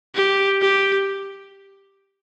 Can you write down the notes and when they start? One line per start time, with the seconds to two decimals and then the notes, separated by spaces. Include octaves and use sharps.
0.15 G4
0.62 G4